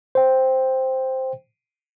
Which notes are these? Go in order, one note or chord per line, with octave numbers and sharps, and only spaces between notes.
C5 G5